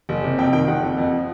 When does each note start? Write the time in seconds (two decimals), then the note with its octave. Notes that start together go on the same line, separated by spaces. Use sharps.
0.09 F#1
0.24 C3
0.38 F2 G5
0.53 D#3 G5
0.68 F#1 F#5
0.83 F2
0.98 F2
1.12 F3